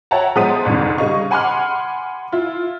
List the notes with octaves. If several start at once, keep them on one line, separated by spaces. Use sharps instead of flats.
C#5 E5 F#5 G5 A5 A#5
F3 G#3 B3 D#6 B6 D#7
G1 C2 F2 D#3
C#3 G3 D#5 F5 C#6
F#5 G#5 B5 C6 D6 F6
E4 F4